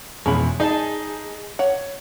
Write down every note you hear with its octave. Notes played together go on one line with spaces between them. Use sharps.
F2 B2 E3 G#3 C#4 B5
D#4 G#4 D#5 A5
C#5 F#5